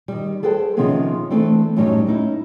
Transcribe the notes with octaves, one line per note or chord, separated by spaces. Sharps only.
D#3 G3
G#4 A4 B4 C5 G5 A5
C3 D#3 F3 B3 C#4 G#4
E3 A3 C4 D4 E4
F#2 A2 F#3 G3 D#4
C#4 D#4 E4